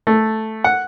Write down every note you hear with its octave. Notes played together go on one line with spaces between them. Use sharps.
A3
F#5